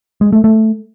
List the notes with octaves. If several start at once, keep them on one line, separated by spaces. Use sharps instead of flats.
G#3
A3
A3